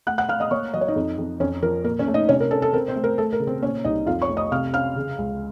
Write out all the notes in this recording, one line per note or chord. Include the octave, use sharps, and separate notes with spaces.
A3 F#5 F#6
F#5 F#6
A3 F5 F6
D#5 D#6
A#3 C#5 C#6
F#3 D#5
C#5
D#4 D#5
F2
F2
F2 C#4 C#5
F3 A#4
A#2 A#4
C#4 C#5
A3
D#4 D#5
C3 C#4 C#5
A#4
C#4 A4
A4
C4 A#4
C4 C5
A3
A#4
A3 A4
A#4
C#3
C4 C5
A#2 C#4 C#5
C2 D#4 D#5
F2 F4 F5
C#5 C#6
A3
D#5 D#6
C3 F5 F6
C#4 F5 F6
C#3
C#2